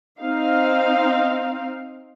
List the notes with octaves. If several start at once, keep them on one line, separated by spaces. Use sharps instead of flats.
C4 D#4 F5